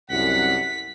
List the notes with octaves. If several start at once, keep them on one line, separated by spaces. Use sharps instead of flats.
C2 F#2 F#5 B6